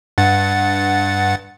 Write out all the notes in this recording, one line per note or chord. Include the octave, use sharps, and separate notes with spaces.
G2 F#5 A6